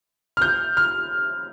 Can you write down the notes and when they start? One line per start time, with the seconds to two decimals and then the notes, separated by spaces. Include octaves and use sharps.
0.37 F6
0.42 G6
0.77 F6